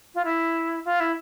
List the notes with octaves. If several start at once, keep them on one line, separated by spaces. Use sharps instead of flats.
F4
E4
F4
E4